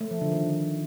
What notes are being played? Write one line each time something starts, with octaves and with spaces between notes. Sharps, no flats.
A3
F3
D3
D#3